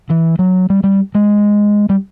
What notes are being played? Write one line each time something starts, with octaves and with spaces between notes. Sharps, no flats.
E3
F#3
G3
G3
G#3
G3